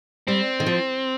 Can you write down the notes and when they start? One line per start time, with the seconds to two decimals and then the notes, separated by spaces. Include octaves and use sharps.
0.27 G3 C4
0.60 D#3
0.66 F3